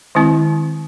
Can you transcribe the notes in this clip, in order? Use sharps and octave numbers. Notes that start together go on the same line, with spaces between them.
D#3 G#3 C4 E4